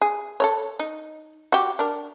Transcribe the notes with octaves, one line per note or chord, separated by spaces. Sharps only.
G#4
A4 A#4 C#5
D#4
F#4 G4
D4 A#4